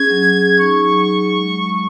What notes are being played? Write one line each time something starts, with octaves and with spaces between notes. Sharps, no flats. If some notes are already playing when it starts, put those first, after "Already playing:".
Already playing: C#4 G#4 G#6
F#3
G#4
D#4 C#6
F#3
F#3
G#3
G#3